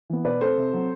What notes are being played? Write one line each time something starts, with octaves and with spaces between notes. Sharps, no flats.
E3 B3
B2 B4 D5
A3 C4 A4 C5
C3
F#3 C4